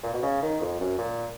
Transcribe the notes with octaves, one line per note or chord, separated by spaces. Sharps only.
A#2
B2
C#3
D#3
F2
F#2
A#2